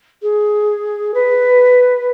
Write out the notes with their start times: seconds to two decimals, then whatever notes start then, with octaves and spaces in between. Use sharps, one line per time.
0.22 G#4
1.14 B4